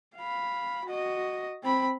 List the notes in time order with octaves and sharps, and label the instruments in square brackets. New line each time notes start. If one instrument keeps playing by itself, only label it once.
[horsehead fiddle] F5 B5
F#4 D#5
C4 B5